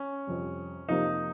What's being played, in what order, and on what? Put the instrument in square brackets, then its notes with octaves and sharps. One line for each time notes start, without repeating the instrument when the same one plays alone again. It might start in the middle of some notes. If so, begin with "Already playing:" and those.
Already playing: [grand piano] C#4
[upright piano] F2 C3 G3
[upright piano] F2 C3 F3 A#3 F4 [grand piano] D#4